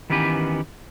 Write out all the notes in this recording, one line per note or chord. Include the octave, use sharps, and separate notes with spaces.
D#3 E3 B3 C#4 G4 B4